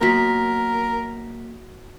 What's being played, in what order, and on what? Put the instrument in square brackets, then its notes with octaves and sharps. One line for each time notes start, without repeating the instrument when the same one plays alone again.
[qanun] F#3 B3 [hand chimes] A#3 B6 [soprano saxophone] A#4